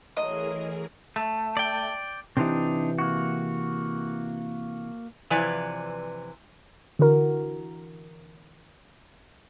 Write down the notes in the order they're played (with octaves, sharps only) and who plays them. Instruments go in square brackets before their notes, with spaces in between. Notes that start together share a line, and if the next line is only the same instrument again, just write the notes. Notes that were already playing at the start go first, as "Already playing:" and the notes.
[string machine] E3 G#4 A#4 [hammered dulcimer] F#3 A3 C6 [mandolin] D#5
[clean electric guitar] A3
[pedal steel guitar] D5 G5
[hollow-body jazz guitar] C3 E3 [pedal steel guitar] C4 D4 D#4
[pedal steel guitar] A#3 F#4
[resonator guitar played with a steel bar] C3 E3 F3 B4 D5 G#5
[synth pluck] D3 E3 F#4 A#4